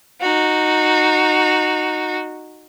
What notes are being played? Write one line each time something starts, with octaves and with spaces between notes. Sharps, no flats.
D#4 F#4